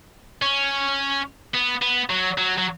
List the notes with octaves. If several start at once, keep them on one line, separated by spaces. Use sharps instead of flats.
C#4
B3
B3
F#3
F#3
F#3